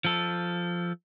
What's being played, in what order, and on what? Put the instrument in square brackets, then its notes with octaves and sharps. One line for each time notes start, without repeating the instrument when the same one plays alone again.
[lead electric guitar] F3 A4